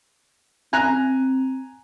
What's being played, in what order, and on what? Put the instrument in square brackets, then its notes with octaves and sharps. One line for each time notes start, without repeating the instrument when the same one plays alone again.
[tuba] C4 [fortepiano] G#5 A#5 F#6